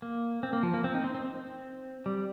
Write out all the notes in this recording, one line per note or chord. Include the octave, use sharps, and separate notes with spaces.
A#3
C4
A#3
F3
A#3
C4
D#4
C4
C4
C4
G3